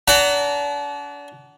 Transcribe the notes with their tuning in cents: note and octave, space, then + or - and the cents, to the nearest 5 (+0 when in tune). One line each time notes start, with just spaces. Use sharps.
D4 -35 F#5 +15 A#5 -30